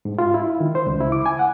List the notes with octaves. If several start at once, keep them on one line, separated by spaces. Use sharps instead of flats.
G#2
F4
E4
D#3
C5
C#2
E4
D6
G#5
F#5